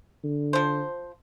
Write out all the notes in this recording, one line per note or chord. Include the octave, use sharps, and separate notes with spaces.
D3
F3 C5